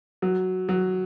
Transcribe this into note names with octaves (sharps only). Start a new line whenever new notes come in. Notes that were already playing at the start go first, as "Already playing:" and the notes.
F#3
F#3